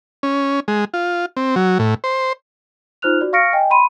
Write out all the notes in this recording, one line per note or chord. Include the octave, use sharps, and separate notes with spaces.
C#4
G#3
F4
C4
F#3
A2
C5
D#4 F4 C5 F6 F#6 F7
F#4 D5
F5 C#6 F6 A#6 C#7 D7
D#5 G5 G#5
B5 C6 D#7